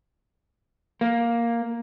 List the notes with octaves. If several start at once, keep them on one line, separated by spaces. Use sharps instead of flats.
A#3